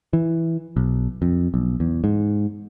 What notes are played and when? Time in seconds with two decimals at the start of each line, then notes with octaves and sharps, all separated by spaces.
0.13 E3
0.77 B1
1.22 F2
1.54 B1
1.80 E2
2.04 G#2